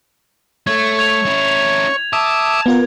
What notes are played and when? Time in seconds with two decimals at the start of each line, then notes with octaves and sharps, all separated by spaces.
0.67 A3 C#5 G#6
0.99 G#6 F7
1.25 C#4 E4
2.13 E5 A5 D6 D#6
2.66 B3 F4 A#4